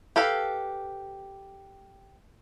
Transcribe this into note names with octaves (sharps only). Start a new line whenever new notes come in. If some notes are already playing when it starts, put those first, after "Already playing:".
G4 A4 B4 F5